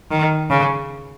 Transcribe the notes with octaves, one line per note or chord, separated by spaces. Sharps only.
D#3
C#3